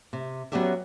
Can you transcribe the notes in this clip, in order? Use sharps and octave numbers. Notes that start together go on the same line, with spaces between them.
C3
F#3 B3 C#4 G4 D5 E5